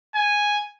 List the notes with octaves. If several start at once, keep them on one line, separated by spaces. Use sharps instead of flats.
G#5